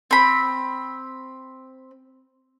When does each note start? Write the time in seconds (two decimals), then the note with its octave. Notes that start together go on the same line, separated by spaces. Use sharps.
0.11 C4 B5